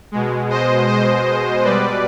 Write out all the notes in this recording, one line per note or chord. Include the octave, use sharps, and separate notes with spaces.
B2 G#3
C5 D#5
C5 D#5
B2 G3 B4 D5